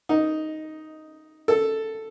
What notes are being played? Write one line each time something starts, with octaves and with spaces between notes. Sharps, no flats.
D#4
A4